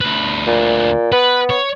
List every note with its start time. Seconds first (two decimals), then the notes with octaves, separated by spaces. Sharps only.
0.01 D2 B4
0.47 A#2
1.12 B3 B4
1.50 C#5